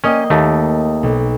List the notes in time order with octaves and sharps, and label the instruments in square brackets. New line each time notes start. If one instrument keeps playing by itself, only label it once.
[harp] A#3 D#5 G5 [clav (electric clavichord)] C#4
[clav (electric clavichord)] D#2 A3
[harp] B1